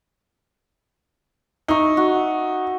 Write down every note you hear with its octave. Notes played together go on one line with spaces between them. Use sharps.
D#4 E5 C#6
F#4